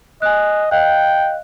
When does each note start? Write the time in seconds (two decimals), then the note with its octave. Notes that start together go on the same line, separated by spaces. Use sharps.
0.22 D#5 G#5 F#6
0.71 D#5 F5 G5 F#6